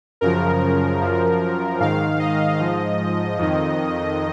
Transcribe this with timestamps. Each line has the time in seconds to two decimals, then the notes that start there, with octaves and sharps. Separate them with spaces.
0.21 F#2 C#3 F3 A#4
1.01 F#2 F3
1.80 G#2 D#3 F5
2.19 D#5
2.59 G#2 F3
3.39 F2 D#3